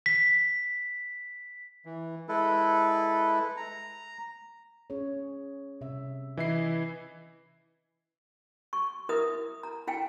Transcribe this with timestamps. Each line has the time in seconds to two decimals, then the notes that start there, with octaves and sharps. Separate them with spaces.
0.06 B6
1.85 E3
2.29 G#3 E4 A4 B4
3.57 A#5
4.90 C#4 G#4 C#5
5.81 C3 E5
6.37 E3 E4 D#5 C7
8.73 C#6
9.09 E4 A#4 B4 E5 D#6
9.63 A#5
9.87 E4 F5 G5 G#5